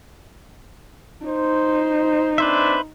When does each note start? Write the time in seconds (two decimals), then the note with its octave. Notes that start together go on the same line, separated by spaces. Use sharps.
1.25 D#4 C5
2.38 C4 D4 B4 C5 E5